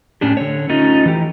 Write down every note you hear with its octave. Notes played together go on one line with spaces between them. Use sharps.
A2 C#4 D4 G4
D3 C#5
A3 C#4 D#4 F4
E3 G4